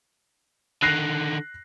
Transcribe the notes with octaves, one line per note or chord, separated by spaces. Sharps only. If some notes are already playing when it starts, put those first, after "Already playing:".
D3 D#3 F#6 A#6 C7